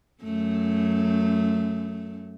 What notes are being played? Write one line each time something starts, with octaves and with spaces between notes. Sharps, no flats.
F#2 A3